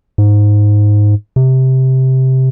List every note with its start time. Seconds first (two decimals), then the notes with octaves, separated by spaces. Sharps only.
0.18 G#2
1.36 C3